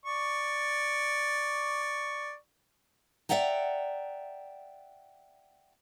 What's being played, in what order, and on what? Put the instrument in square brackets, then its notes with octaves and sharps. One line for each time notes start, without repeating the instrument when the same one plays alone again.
[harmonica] D5 C#6
[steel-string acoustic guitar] D5 E5 F#5 G5 A#5